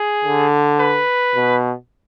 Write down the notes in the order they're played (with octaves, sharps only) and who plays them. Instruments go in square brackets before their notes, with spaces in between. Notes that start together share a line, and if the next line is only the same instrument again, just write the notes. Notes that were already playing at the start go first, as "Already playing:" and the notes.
Already playing: [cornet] G#4
[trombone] D3
[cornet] B4
[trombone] B2